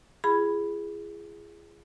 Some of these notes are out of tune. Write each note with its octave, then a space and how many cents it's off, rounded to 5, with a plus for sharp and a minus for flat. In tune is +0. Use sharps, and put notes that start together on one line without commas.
F4 -45 G#4 -5 B5 +0